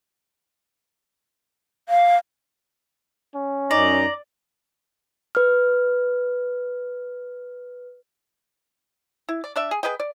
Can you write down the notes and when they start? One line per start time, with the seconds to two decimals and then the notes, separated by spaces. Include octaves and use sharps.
1.89 F5
3.35 C#4
3.71 F#2 D#4 D5 D#5 A#5
5.35 B4 F6
9.29 E4
9.44 D5
9.56 D4 D5 E5
9.71 G#4
9.83 G#4 B4 D#5 G5
10.00 D5